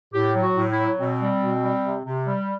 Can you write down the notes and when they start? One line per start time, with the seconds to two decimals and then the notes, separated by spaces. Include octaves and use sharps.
0.13 A2 G4
0.34 F#3
0.42 F#4
0.55 A2
0.70 E4
0.78 F#3
0.98 B2 C4
1.21 G3
1.41 B2
1.63 G3
1.84 C3
2.05 C3
2.27 G3